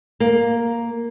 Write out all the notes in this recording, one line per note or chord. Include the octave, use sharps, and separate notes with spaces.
A#3